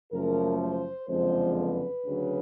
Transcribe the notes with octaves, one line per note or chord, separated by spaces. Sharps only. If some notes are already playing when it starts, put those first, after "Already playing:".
F#1 F#2 C#3 F3 A3 A#4
C5
F#1 F2 D3 F3 G#3 C5
B4
D2 C#3 F#3